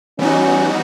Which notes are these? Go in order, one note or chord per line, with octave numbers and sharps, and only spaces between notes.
E3 G3 B3 C#4 D#4 F#4